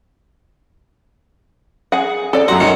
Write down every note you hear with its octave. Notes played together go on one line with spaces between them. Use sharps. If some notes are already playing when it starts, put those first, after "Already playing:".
G#4 F#5
A4 D5
F#2 F#3 F#4 F#5 C6
F#2 D#3 C#7